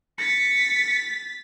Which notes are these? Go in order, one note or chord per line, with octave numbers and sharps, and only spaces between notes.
A6 B6 C#7